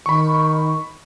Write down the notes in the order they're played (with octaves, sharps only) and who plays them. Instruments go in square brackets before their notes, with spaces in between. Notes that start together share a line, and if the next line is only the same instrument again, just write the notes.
[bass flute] D#3 [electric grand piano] B5 C#6